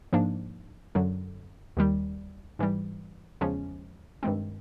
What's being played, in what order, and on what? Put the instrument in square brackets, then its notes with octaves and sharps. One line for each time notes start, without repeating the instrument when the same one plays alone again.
[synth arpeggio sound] G#2 F3 A#3 D4
F#2 D3 F#3
D#2 D#3 G3
G#2 E3 G3
E2 C#3 F3 G#3 C#4
G2 D#3 G#3 C4